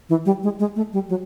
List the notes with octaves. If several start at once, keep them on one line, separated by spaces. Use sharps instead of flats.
E3
G3
G#3
G#3
A3
G3
F#3